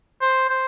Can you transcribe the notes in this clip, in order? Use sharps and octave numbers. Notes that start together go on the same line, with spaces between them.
C5
C5